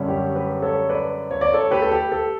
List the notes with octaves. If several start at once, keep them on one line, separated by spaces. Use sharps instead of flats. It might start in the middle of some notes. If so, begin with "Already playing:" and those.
Already playing: F#2 D3 G3 C#4
G4
G4 B4
A4 C#5
B4 D5
C#5
D5
A4 C#5
G4 B4
A4
G4
A4